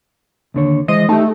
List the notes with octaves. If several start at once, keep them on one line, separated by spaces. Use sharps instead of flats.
D#2 D3 C#5
E3 G#3 C5 D#5
A3 D#4 G4